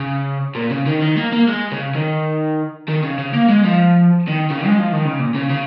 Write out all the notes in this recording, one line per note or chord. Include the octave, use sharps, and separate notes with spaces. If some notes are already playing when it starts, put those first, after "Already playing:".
Already playing: C#3
A#2
C#3
D#3
D#3
A#3
A#3
G#3
C#3
D#3
D#3
C#3
C#3
A#3
G#3
F3
D#3
C#3
G#3
F3
D#3
C#3
A#2
C#3
C#3